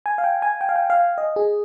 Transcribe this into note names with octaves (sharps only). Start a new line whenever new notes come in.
G#5
F5
G5
G#5
G5
F5
G5
F5
D#5
G#4